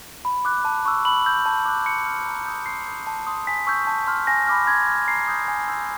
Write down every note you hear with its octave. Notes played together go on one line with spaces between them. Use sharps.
B5
D6 F#6
A5
C#6 E6
B5 F#7
E6 G6
A5
D6 F#6
C6 C#7
F6
A#5
D#6 G6
C6 C7
D#6 G6
A5
C6 D#6
G#5 B6
C#6 E6 G6
A5
C6 F6
G#5 A#6
B5 D6 F6
C6 G#6
F6
A#5 C7
D#6 G6
G#5
C6 E6 G6